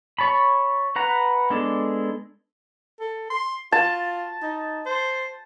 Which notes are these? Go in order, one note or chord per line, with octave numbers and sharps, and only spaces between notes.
C#5 A5 B5
B4 F#5 A#5
G#3 B3 D4 A4
A4
C6
F4 A5
D#4
C5